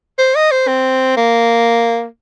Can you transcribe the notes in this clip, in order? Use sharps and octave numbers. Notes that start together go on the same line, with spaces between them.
C5
D#5
C5
C4
A#3